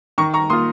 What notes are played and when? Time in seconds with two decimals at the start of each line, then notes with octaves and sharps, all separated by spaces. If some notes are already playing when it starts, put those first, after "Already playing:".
0.18 D#3 A#5 C#6
0.34 A#5 C#6
0.50 A#3 C6 D#6
0.53 F4